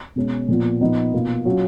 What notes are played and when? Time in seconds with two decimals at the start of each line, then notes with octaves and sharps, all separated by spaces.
0.16 B2 G#3 C#4
0.48 A#2 F3 B3
0.81 A#2 F3 B3 D#4
1.13 B2 A#3 F4
1.45 F#3 C#4 F4